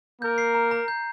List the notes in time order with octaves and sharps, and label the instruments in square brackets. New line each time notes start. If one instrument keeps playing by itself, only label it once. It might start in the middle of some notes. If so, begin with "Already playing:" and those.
[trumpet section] A#3 A#4 [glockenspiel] G6
[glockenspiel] C7
A#5
A#5
G6